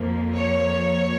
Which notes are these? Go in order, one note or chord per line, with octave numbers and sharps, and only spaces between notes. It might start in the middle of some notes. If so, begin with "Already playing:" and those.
Already playing: F2 F3 A#3
C#5